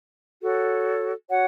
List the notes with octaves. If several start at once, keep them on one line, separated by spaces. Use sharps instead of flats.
F#4 A4 C#5
F#4 C#5 F#5